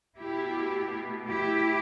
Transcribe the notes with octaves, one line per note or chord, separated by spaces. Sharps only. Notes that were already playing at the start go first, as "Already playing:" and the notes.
B2 A3 E4 G4
E4 G4